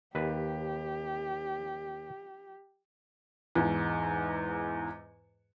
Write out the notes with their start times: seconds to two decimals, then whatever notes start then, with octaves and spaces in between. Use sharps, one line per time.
0.15 D#2 G4 B4
3.55 E2 G#2